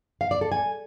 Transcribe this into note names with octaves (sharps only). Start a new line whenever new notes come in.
F5
D5
A4
G#5